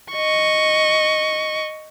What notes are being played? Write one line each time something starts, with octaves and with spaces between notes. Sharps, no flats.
D#5 C#6